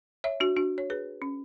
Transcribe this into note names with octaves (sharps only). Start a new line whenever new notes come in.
C#5 E5
D4 F#4
D4 F#4
C#5
G#4 B4
C#4